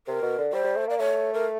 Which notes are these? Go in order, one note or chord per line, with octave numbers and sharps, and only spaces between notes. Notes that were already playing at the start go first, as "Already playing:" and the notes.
C3 A#4
B2
D3
G3 C5
G3
A3
A#3 D5
A3 C#5
A#4